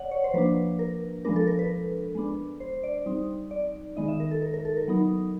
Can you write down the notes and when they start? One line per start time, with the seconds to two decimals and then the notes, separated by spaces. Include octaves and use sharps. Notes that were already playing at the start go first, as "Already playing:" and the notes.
Already playing: C#5 D5 F#5
0.11 C#5
0.24 C5
0.34 F3 A#3 D4 B4
0.79 A#4
1.25 F3 G#3 B3 D4 A#4
1.36 A4
1.47 A#4
1.59 B4
2.15 G#3 B3 D4
2.60 C5
2.83 D5
3.06 G3 C4 D#4
3.51 D5
3.96 D#3 G#3 B3 D#4 D#5
4.08 E5
4.20 A#4
4.31 A4
4.42 A#4
4.54 A#4
4.65 A4
4.77 A#4
4.88 F#3 B3 D#4